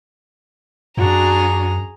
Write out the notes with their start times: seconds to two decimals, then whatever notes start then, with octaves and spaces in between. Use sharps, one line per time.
0.97 F#2 D4 F#4 G#4 A#5